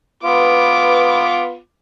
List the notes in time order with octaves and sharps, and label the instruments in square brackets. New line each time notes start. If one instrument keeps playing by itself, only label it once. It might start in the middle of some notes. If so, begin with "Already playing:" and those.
[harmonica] B3 F4 [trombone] B4 [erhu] D6